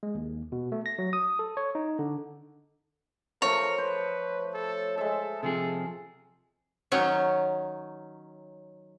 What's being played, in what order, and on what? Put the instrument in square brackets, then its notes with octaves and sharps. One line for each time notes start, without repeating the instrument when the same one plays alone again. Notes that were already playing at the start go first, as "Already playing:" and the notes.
[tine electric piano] G#3
D#2
B2
A3
A#6
F#3
D#6
A4
C#5
D#4
D3
[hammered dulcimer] F3 A3 [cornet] A#4 [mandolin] C#5
[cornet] B4 [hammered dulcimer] C5
[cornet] A4
[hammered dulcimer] G#3 E5 [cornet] A4
[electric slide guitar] C3 F3 G#4 [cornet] A4
[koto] D#3 F#3 C#4